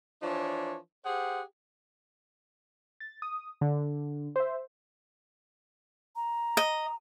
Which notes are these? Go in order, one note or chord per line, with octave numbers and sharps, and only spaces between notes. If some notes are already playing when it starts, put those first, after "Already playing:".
E3 F3 D4 C#5
G4 G#4 C5 F#5
A6
D#6
D3
C5 E5
A#5
D#5